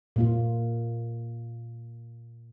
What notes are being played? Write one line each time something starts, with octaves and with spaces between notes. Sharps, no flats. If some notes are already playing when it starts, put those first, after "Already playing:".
A#2 A#3 F4